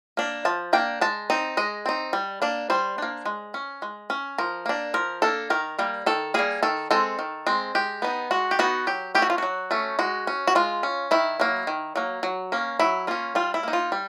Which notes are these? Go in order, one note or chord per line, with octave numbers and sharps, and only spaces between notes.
A#3 D4
F3 A5
A#3 D4 G5
G#3 A5
C4 D#4
G#3 D#5
C4 D#4
G3
A#3 D4
G3 C5
A#3 D4
G#3
C#4
G#3
C#4
F3 A#4
A#3 D4
F3 A#4
A#3 D4 A4
D#3 A#4
G3 A#3
D#3 A4
G3 A#3 G#4
D#3 A4
G#3 C4 A4
D#3
G#3 C4
G#3 G4
B3 D#4
G#3 F#4
G4
B3 D#4 F#4
F#3 G4
A3 C#4 G4
F#4
F4
F#3 F#4
A3 C#4
G#3 F#4
C#4
F#4
G#3 F4
C#4
D#3 E4
F#3 A#3
D#3
F#3 A#3
F#3
A#3 C#4
F#3 E4
A#3 C#4 F4
G3 F4
E4
A#3 D#4
F4
G3